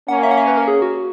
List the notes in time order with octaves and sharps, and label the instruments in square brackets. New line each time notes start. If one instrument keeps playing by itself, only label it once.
[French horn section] A#3 C#4 [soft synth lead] F#5
[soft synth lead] E5
F#5
E5
B4
A#4
G#4
F#4